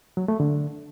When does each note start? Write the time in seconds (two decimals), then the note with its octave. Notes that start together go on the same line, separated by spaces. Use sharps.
0.17 F#3
0.28 A3
0.40 D3